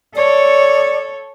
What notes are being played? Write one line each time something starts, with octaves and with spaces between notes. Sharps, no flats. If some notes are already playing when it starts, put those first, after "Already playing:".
A4 C#5 D5